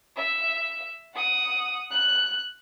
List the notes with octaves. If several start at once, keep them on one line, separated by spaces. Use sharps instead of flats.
E5
F#5 D#6
F#6